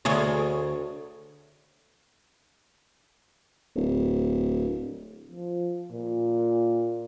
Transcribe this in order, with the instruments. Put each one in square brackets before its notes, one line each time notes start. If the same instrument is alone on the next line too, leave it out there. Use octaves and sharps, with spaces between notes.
[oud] D2 G#4 C#5
[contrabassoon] D1
[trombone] F3
A#2